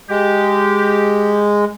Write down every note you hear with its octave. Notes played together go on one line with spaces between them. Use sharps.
G#3 G4